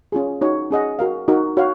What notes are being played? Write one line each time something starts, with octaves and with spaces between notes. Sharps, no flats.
C#4 F4 G#4
D#4 F#4 C#5
C#4 G#4 D#5 F#5
F#4 A#4 F5
D#4 F#4 A#4
F#4 C#5 F5